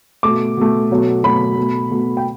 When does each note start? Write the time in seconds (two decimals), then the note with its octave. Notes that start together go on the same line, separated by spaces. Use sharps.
0.23 B2 A3 D6
0.57 B2 A3
0.91 B2 F#3 A3
1.24 B2 F#3 A3 B5
1.57 B2 A3
1.91 B2 A3
2.17 G5